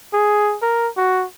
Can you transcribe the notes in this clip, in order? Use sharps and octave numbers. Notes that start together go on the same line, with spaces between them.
G#4
A#4
F#4